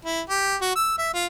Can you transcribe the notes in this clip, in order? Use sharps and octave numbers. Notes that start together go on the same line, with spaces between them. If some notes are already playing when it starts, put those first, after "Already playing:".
E4
G4
F#4
E6
E5
F4